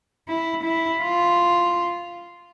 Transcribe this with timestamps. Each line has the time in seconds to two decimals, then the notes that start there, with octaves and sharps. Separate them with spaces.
0.28 E4
0.64 E4
1.01 F4